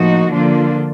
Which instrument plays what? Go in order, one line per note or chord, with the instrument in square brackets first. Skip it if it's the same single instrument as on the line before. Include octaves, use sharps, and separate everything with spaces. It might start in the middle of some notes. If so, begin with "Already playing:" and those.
Already playing: [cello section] A2 F3 A#3 D#4 F#4
D3 F3 A#3 D4 F4